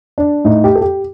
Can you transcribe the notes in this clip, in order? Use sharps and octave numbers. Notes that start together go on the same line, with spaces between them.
D4
A2 D#4
G4
A4
G4